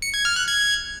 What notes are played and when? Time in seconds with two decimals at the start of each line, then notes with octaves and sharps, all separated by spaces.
0.02 C#7
0.14 G#6
0.25 F6
0.36 F#6
0.48 G#6